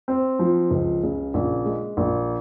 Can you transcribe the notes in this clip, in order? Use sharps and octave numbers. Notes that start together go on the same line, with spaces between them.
C4
F3
C#2
C#3
A#1
G#3
A#1